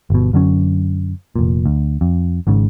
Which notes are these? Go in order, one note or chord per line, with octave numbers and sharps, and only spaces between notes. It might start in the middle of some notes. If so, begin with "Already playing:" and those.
G1 B2
F#2 D3 F#3 C#4
F1 A#2
D2
F2
G#1 G#2 C#3